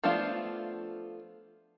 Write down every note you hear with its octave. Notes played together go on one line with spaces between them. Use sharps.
F3 A3 B3 D4 F4